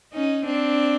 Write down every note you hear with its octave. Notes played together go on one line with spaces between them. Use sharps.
C#4 D#4
C4 D4